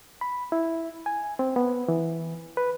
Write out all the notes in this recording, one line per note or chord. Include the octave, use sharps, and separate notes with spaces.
B5
E4
G#5
C4
B3
E3
B4